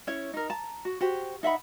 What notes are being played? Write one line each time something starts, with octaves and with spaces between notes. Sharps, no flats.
C#4 E4 C#5
D#4 A#4
A5 A#5
F#4
F#4 G4 C5
D#4 E5 F#5 B5